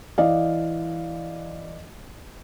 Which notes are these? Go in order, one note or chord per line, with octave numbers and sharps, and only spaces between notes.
E3 D5 D#5 F5